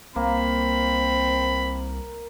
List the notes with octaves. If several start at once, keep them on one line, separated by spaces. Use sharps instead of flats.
C2 A#3 C4 B5